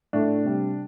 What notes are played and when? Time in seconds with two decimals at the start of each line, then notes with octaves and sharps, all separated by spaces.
0.13 A2 A3 D4
0.44 C3 G3